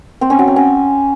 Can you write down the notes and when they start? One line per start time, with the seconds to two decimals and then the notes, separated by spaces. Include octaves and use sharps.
0.21 C4
0.30 C#4
0.39 F#3
0.47 C4
0.56 C#4